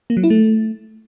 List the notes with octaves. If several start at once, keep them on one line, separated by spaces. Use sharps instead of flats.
A#3
F#3
E4
A3